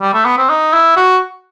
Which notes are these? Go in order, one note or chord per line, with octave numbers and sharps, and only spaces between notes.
G3
A3
B3
C4
D#4
E4
F#4